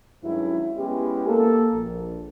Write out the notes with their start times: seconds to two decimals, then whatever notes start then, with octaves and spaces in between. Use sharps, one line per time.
0.24 G2 D#3 F#3 G#3 C#4 E4
0.77 G#3 B3 C#4 E4 G4
1.27 A#3 A4
1.73 A#1